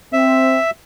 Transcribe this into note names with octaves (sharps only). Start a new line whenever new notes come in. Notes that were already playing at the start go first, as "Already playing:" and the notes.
C4 E5